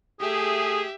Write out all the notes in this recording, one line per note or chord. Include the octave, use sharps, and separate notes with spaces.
A3 G4 G#4 E5